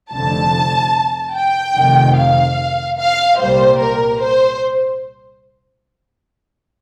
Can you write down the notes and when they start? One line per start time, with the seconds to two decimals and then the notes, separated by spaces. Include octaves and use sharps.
0.12 F1 F2 D3 A5
1.35 G5
1.76 F1 F2 C3 D#3
2.17 F5
2.98 F5
3.39 C2 A#2 G3 A#3 C5
3.80 A#4
4.21 C5